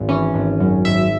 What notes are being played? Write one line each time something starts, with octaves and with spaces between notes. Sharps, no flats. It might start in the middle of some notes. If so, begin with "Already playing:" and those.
Already playing: G#1
E3 C#4
G#1
F#2
G#1 E5